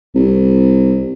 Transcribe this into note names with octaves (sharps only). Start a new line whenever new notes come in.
C2